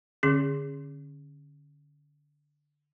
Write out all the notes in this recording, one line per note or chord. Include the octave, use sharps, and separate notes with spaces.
D3 C#4 G#4